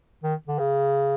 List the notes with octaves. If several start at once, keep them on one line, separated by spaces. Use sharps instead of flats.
D#3
D3
C#3